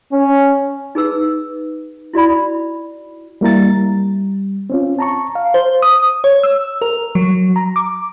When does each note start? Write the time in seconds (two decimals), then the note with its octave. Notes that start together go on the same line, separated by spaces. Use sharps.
0.12 C#4
0.95 D#4 G#4 B4 E6
2.13 E4 F#4 D5 B5
3.41 G3 A#3 E4 A#5 A6
3.77 G3
4.70 C4 C#4 F4
4.99 A5 A#5 C#6
5.35 F5
5.54 C5
5.82 D#6
6.24 C#5
6.43 E6
6.82 A#4
7.15 F#3
7.56 A#5
7.76 D6